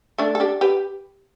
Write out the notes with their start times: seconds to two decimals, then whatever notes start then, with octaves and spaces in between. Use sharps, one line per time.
0.18 A3 D4
0.35 A4
0.40 D4 G4
0.61 G4 B4